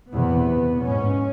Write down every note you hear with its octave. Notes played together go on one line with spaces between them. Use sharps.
E2 C3 B3
G#2 C#4